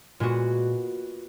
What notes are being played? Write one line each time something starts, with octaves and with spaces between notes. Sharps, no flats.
A#2 G#3 B3 F#4